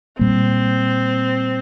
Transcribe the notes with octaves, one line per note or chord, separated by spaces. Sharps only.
A#2 G3 A#3 C4